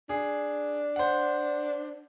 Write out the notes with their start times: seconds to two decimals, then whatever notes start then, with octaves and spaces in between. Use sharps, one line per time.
0.09 D4 G#4
0.96 C5 F#5